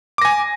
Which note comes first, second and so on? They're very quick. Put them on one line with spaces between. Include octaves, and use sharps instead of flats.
D6 A#6 G#5